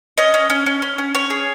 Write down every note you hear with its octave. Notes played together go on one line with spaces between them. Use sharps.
C#4 D#5
C#4
C#4
C#4
C#4
C#4
C#4 C#5
G#4